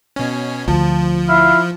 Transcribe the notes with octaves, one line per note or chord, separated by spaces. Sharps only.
B2 C#4
D2 F3 A5
E4 F5